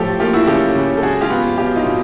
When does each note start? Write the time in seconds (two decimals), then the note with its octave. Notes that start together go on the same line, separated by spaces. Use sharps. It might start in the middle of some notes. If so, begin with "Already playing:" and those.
Already playing: A2 F3 G4 A4
0.20 A#3 F4 G4
0.34 E4 F#4
0.47 C#3 G4 A4
0.75 C#3
0.97 A4
1.03 G#3 F#4 G#4
1.21 F4 G4
1.30 B3
1.58 B2 F4 G4
1.76 D#4 F4
1.86 B2